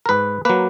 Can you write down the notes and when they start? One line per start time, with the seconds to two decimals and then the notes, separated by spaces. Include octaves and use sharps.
0.06 A#4
0.09 G#2 B4
0.45 F#3 A#3 B4